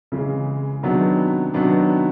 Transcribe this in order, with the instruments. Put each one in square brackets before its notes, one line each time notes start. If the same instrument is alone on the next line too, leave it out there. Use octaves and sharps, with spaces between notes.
[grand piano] C#3 E3 G#3
C3 D#3 F#3 B3 D4
C3 D#3 F#3 B3 D4